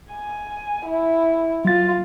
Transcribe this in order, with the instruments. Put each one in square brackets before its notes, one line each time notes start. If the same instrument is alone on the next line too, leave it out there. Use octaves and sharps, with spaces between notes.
[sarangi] G#5
E4
[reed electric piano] F#3 A6 [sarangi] F4